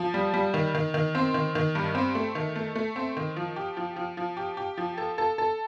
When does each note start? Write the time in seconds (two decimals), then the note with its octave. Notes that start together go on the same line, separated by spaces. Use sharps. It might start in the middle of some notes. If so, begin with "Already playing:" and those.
Already playing: F3
0.14 G3
0.34 G3
0.54 D#3
0.75 D#3
0.94 D#3
1.15 C4
1.34 D#3
1.55 D#3
1.75 G2
1.95 C4
2.15 A3
2.35 D#3
2.56 A3
2.76 A3
2.96 C4
3.17 D#3
3.36 F3
3.56 G4
3.77 F3
3.96 F3
4.17 F3
4.37 G4
4.57 G4
4.77 F3
4.97 A4
5.18 A4
5.38 A4